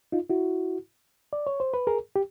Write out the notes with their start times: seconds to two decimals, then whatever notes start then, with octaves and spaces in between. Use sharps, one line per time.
0.12 D#4 F4
0.30 E4 F#4
1.33 D5
1.47 C#5
1.60 C5
1.74 B4
1.87 G#4 A#4
2.16 G4